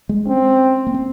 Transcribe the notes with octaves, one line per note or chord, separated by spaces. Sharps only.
G#3
C4 C#4
A#3
C4